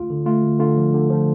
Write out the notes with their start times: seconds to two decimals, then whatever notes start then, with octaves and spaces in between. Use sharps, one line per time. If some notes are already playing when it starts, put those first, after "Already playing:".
Already playing: D2 F4
0.10 D3
0.26 A3 F4
0.43 D2
0.59 D3 F4
0.77 F3
0.94 D3
1.10 F3